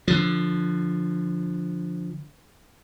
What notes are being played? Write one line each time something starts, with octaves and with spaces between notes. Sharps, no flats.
D3 F3